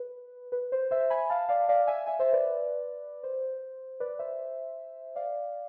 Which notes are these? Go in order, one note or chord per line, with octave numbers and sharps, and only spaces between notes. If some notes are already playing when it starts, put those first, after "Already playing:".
Already playing: B4
B4
C5
C5 E5
G#5 B5
F5 A5
D5 F5
D5 F5
E5 G#5
E5 G#5
C5 E5
B4 D5
C5
B4 D5
C5 E5
D5 F5